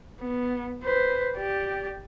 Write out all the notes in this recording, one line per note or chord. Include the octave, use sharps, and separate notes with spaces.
B3
B4 C5
G4 D5